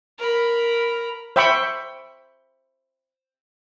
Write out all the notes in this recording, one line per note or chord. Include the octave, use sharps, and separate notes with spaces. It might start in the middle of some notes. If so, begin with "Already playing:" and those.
A#4 B5
C5 E5 G5 B5 C#6